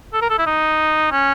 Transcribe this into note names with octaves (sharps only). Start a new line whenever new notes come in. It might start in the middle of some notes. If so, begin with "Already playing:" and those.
A4
A#4
A4
E4
D#4
C#4